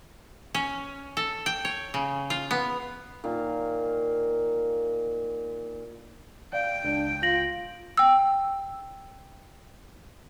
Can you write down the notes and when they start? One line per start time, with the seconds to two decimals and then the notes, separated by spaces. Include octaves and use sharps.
0.54 C#4
1.17 A4
1.46 G5
1.65 C#5
1.94 C#3
2.30 F4
2.51 B3
3.24 A#2 D#3 F5
6.53 D5 F5 G5
6.85 C#2 D4
7.23 F4 A#6 F#7
7.97 G5 E6